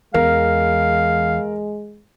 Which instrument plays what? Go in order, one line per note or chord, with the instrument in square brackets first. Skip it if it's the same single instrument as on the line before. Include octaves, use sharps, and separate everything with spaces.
[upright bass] E2 [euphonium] G#3 [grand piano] A#4 [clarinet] F5